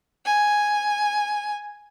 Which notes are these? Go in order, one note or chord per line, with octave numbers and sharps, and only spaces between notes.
G#5